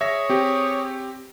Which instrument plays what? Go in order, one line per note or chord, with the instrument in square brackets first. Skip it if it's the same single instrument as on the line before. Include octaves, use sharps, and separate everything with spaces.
[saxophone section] G#4 C#5 [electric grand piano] E5 A#6
[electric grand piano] C4 G4